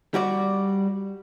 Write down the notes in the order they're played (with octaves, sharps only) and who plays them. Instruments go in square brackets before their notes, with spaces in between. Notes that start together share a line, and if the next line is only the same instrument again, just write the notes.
[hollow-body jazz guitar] G3 F#4 D5